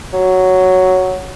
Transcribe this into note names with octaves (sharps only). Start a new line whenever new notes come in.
F#3